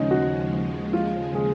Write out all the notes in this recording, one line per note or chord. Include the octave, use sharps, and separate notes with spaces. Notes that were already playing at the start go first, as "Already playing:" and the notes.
Already playing: D#2 C#3 F3 G#3 C#4 D#4
F#4
F4
G#4